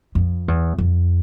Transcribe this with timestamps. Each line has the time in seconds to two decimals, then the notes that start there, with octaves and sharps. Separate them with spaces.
0.15 F2
0.48 E2
0.78 F2